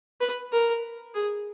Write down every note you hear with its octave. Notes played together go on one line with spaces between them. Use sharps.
B4
A#4
G#4